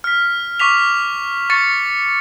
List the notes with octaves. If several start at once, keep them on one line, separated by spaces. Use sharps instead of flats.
F6 B6
C#6 D6 B6 F7
C#6 A6 C#7